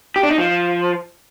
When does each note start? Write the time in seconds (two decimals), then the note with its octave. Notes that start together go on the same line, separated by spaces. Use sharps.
0.16 G4
0.23 D4
0.31 D#4
0.38 F3